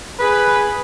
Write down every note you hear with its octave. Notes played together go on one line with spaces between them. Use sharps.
G#4 B4